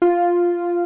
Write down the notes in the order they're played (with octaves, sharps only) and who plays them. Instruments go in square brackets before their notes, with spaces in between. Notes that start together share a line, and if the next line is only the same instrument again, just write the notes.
[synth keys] F4